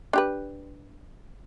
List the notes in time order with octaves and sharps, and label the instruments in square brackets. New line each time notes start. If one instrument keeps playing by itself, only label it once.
[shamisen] D4 G4 B4